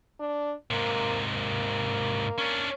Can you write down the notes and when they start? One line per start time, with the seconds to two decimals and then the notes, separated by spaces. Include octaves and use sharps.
0.20 D4
0.71 G#2 C3 A#3
1.35 A#3
2.38 C#4 D4